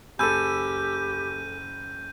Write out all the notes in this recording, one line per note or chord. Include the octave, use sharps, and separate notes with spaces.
F#1 G4 A4 G#5 B5 E6 G6 D#7